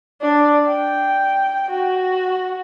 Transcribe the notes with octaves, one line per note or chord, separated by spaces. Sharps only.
D4
G5
F#4